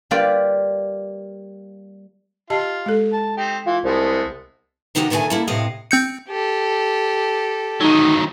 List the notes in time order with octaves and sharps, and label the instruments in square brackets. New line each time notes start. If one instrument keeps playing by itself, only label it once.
[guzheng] G3 A#3 F4 B4 D5
[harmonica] F4 [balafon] G4 D#5 A5
[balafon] G#3 A4
[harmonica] A5
C4 D#4 G4
[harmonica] E3 [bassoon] F4
[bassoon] C2 [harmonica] G#3 A3 B3
[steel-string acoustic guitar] C3 D#3 D#4 E4 F#4 G4
D2 A#2 D#3 A3 D5 G#5
A#3 E4 A4
A2 C3 C4 D#5 F5
[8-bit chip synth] C4 G6 C#7
[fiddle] G4 A4
[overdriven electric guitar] D#3 F#3 [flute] D#4